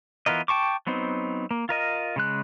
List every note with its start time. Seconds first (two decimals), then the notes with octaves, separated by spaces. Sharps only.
0.26 E3 B3 F4 A#4 D#5
0.48 G5 A5 C#6 D6
0.87 F#3 B3 C4 D#4
1.51 A#3
1.69 F4 A#4 D#5
2.16 C#3 G#3 F#6